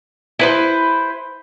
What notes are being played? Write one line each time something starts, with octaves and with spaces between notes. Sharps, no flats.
E4 B4 C5